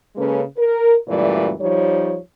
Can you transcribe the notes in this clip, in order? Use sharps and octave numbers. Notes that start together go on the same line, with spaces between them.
C#3 G#3 A#3 C#4 A4 B4
A#4
F#2 A#2 E3 G3 A3 D5
F3 G3 D#4 C#5